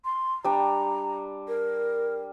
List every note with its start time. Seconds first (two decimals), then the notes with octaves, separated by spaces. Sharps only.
0.05 C6
0.44 G3 D4 A#5
1.48 A#4